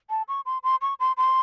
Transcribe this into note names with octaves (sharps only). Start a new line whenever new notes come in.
A5
C#6
C6
C6
C#6
C6
C6